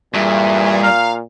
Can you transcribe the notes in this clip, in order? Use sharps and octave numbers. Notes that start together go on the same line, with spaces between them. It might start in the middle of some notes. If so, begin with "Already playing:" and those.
G2 A#2 E3 G#4 E5
F5 A#5